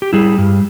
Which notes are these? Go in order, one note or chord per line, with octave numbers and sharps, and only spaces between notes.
G4
G3 E4 G#4
G2